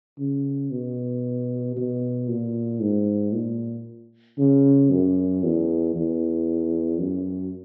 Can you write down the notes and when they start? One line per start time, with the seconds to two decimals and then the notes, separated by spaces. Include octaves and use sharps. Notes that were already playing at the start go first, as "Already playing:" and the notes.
0.18 C#3
0.71 B2
1.76 B2
2.29 A#2
2.81 G#2
3.33 A#2
4.38 C#3
4.91 F#2
5.44 E2
5.95 E2
7.00 F#2